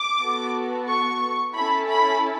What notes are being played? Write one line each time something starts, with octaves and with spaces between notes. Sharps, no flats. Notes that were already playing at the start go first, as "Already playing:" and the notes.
Already playing: D6
B3 F#4 A4
C#6
C#4 E4 A4 B5
B5